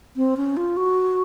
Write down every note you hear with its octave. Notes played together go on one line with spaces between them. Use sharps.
C4
C#4
F4
F#4